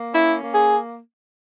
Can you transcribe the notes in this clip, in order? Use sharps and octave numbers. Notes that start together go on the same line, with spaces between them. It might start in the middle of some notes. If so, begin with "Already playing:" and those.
Already playing: A#3
C#4 E4
A#3
G#4